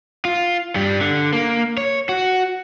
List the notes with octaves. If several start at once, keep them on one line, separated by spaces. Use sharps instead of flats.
F4
G2 G3
D3
A#3
C#5
F#4